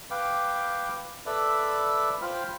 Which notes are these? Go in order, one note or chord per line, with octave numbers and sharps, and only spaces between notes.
B4 F5 G5 D6
A4 B4 D5 E5 B5
F4 C5 F5 G5 B5 F6